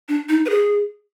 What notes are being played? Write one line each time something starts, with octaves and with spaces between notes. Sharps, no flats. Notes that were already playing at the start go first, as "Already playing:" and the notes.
D4
D#4
B4
G#4